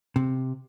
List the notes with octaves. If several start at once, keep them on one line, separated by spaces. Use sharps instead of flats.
C3